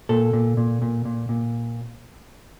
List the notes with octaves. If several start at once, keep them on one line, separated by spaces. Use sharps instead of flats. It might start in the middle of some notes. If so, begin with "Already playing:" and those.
A#2 A4
A#2
A#2
A#2
A#2
A#2